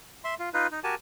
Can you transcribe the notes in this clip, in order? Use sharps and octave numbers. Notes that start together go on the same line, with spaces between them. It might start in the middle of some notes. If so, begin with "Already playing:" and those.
E5 C6
F4
D#4 F4 B4
D#4
F#4 G4 A#4 G#5 A5